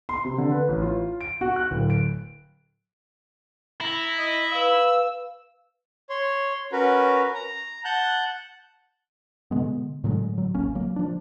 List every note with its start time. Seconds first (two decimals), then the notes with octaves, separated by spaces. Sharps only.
0.09 C6
0.25 C3
0.38 D3
0.52 B4
0.68 A1
0.82 F4
1.21 D7
1.41 F#4
1.56 F#6
1.71 D1
1.90 D7
3.81 E4 A#5
4.18 D#5
4.52 B4 F5 E6
6.10 C#5 C6
6.72 C#4 F#4 A#4 B4
7.35 A#5
7.85 F#5 A5 F#6 G6
9.51 B2 D3 G#3 B3
10.04 A2 D3 F#3 G#3
10.38 F#3
10.55 A1 D2 A#3 C#4
10.75 F#3 A#3
10.96 F3 D4